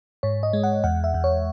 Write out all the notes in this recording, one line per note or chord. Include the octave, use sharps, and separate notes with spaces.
G#2 C#5
D#5
G#3
F#5
E2 F#5
E5
E2
C#5